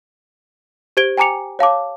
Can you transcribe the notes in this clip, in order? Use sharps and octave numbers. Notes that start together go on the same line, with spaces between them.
G4 C5 G#6 D7 G7
G5 G#5 A#5 D6 C#7 F7
C#5 F5 A5 D6